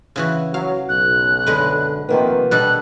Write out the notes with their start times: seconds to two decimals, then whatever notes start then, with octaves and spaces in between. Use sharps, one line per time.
0.16 C#3 E3 F#4
0.54 F#3 F5
0.89 B1 F#6
1.46 F#2 D3 G#3 B4
2.09 C3 D#3 F3 A#3 B3
2.51 B2 D#3 G3 D4 A4 F#6